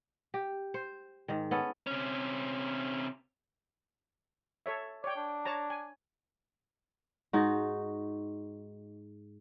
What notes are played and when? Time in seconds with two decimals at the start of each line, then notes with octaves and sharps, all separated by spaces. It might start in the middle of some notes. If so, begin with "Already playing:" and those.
0.34 G4
0.74 C5
1.28 G#2 D#3
1.51 B3 C#4 A4
1.87 C3 C#4
4.66 A4 C#5 E5
5.04 C#5 D5 G5
5.17 D4
5.45 C#5 A5 A#5
5.70 G#5
7.33 G#2 D#4 F#4